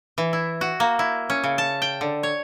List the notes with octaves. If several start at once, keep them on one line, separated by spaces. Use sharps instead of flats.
E3
E4
F#4
A#3
E4
C#4
C#3
A5
G5
D3
C#5